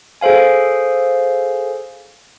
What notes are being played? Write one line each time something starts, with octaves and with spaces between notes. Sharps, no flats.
G#4 A4 C5 F5 G#5